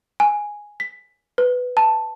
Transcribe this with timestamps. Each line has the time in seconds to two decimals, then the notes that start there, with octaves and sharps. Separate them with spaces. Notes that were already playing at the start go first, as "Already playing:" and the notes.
0.20 G#5
0.80 B6
1.38 B4
1.77 A5